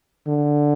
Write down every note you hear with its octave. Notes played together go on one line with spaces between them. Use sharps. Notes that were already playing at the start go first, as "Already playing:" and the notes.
D3